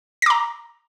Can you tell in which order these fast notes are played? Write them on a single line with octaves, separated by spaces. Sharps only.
A#6 D6 A#5